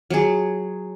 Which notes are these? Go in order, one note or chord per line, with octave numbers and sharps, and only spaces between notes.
F#3 G#4